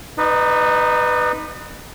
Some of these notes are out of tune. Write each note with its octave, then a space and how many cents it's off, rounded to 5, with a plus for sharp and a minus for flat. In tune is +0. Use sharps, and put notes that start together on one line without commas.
D#4 +0 B4 +5 D5 +45